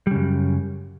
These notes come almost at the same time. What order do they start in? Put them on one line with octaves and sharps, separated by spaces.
G3 C#3 F#2